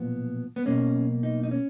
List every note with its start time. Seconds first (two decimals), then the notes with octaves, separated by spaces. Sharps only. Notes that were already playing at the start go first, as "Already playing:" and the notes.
Already playing: B1 A#2 F3 B3
0.56 B3
0.66 B1 B2 A#3 C#4
1.23 D#4
1.43 D#4
1.51 C#4